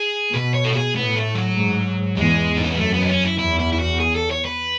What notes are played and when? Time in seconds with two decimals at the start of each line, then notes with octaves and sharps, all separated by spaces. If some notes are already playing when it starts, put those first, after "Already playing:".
Already playing: G#4
0.34 B2 B4
0.54 C#5
0.64 A4
0.75 G#4
0.96 A2 B3
1.16 A3
1.35 F#3
1.56 G#2
2.17 E2 G#3
2.57 D#4
2.64 C#4
2.71 B3
2.77 F#2 A3
2.94 B3
3.02 D#4
3.09 C#4
3.24 E4
3.38 E2 E4
3.59 E4
3.72 E4
3.79 F#4
4.00 G#4
4.15 A4
4.30 C#5
4.45 B4